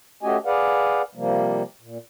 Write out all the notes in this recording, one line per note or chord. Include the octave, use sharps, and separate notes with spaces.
A3 C#4 F#4 G4 D#5 G#5
G#4 B4 D5 F5 F#5
C3 F3 G3 A#3
A#2